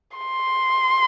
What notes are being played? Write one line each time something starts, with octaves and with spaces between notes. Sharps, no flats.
C6